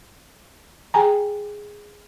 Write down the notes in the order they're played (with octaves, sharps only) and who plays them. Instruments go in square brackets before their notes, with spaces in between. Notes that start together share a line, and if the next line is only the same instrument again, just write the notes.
[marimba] G#4 G5 G#5 A#5